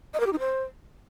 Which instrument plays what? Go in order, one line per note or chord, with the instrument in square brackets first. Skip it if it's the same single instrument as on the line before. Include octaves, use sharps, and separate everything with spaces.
[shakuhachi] D#5
A#4
G4
D#4
C5